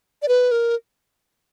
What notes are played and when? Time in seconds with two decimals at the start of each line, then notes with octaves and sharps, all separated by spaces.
0.22 D5
0.28 B4
0.51 A#4